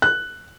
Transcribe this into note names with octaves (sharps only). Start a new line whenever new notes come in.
F#6